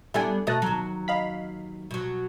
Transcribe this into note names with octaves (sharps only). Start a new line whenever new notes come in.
G3 B3 D4 E4 A4 G#5
B2 A3 D#5 A5 F#6
D#2 F#3
D#5 F5 B5
B2 F#3